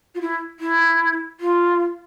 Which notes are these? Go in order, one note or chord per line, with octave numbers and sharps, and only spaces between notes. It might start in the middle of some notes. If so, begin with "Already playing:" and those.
F4
E4
E4
F4